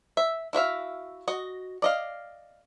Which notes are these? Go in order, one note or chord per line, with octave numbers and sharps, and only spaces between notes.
E5
E4 F#4 E5 F5
F#4 D#5
D5 D#5 F5